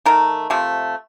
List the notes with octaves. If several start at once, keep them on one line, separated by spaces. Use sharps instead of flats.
D#3 A3 A#4
C3 F3 A3